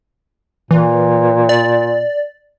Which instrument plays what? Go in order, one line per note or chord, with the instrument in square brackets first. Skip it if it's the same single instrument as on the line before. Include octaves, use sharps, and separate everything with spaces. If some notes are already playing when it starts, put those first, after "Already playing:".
[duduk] A#2 [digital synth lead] E3
[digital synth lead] D5